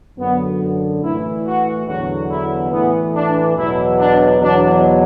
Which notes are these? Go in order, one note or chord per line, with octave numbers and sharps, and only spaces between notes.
F#2 D3 F#3 B3
A2 E3 E4
F#4
E2 D3 F#3 F#4
E4
A2 E3 B3
D4
E2 B2 F#3 E4
D4
E2 B2 F#3 D4